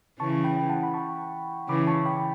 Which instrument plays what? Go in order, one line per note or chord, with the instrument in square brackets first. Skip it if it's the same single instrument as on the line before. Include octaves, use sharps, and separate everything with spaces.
[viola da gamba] C#3 E3 [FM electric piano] A5 C#6
[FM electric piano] G5 B5
F#5 A5
B5
A5 C#6
[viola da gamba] C#3 E3 [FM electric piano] B5 D6
[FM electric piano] A5 C#6
G5 B5